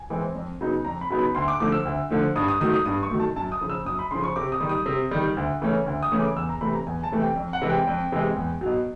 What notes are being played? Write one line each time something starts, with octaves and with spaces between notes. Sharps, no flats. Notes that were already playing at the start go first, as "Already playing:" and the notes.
Already playing: G#5
E3 G#3 C4
F2
C#3 F#3 B3 D#4
F2 A#5
B5
C#3 F#3 B3 D#4
B5
D2 C6
D6
D3 F3 A3 D6
E6
D2
D3 F3 A3
G2 D#6
D#6
D#3 F#3 A3 D#6
D#6
G2 D#6
C#6
D#3 F#3 A3
A5
F#2 A5
D#6
C#3 F3
E6
F#2 D#6
B5
C#3 F3 C6
C#6
C3 D6
D#6
D#3 G3
D#6
C3
D#3 G3
D2
C#3 E3 A3 C#4
D2
D#6
C#3 E3 A3 C#4
D6
E2 E6
A#5
C3 E3 A3 B5
A#5
E2 G#5
A5
C3 E3 A3
G5
F2
F#5
C3 E3 G#3
G5
F2
C3 E3 G#3
E2
B2 F#3